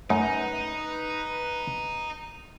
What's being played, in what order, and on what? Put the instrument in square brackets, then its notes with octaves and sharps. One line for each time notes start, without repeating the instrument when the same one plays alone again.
[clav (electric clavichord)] F#2 [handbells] A3 [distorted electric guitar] D#4 [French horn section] B4